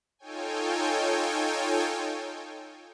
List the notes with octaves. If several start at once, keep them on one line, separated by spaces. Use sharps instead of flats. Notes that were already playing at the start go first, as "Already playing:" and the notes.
D#4 F4 A4 C#5 G5 G#5